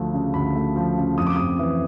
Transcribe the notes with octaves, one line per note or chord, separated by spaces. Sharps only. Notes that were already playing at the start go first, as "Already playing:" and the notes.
Already playing: D2 F3 A3
C#3
D2 B5
A3
F3
C#3
F2 D#6
D6
F2 D#6
E3